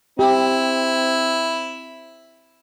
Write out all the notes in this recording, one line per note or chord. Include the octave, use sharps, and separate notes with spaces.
C4 E4 G4